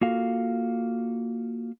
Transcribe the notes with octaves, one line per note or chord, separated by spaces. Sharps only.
A#3 F4 F#4 A4 F5